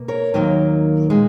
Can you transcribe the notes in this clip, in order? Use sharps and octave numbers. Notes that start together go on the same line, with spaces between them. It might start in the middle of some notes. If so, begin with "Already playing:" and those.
Already playing: B2 A#3
A#4 C#5
D#2 D#3 F#3 A#3
A#2 G#3